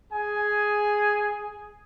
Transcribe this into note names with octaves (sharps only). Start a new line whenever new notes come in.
G#4 G#5